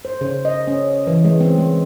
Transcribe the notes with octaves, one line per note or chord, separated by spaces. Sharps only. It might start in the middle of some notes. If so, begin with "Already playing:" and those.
C5
C#3
D#5
C#4
E3
G#3
C4
G#3